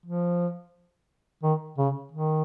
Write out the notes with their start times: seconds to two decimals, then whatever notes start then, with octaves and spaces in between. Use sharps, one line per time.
0.06 F3
1.43 D#3
1.78 C#3
2.12 D#3